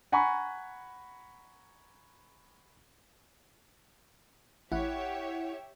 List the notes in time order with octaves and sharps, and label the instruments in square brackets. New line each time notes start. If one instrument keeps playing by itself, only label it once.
[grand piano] F#5 G#5 A#5 B5 C#6
[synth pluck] A1 [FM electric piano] E4 F#5 [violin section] G4 C#5 E5